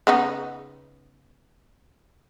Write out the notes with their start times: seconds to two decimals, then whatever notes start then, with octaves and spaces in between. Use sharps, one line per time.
0.07 C#3 B3 D#4